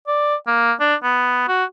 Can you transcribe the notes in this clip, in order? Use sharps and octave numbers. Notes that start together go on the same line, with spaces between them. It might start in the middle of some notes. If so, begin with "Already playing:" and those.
D5
A#3
D4
B3
F#4